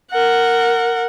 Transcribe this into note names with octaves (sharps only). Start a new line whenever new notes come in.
A#4 F#5